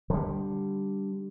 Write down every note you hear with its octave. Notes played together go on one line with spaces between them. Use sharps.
D3 G3